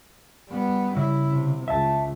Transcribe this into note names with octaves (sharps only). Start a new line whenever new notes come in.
G3 B3
C#3 E4
C3
C#2 E5 A5